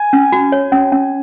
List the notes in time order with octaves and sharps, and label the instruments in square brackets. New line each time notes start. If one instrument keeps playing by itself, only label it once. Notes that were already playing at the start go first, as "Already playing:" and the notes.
Already playing: [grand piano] G#5
[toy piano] C#4
F#4
C#5
C#4
C#4